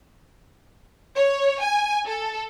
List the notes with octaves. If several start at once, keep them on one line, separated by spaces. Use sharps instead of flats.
C#5
G#5
A4